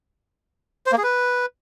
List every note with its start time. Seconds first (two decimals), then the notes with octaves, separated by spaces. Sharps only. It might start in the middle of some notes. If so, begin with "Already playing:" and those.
0.86 C5
0.92 A#3
0.98 G#4
1.03 B4